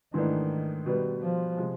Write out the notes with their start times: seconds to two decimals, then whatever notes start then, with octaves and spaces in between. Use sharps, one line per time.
0.14 G#2 D#3 E3 A3 D4
0.86 B2 G3 B3
1.22 F3
1.58 C3 F3 G#3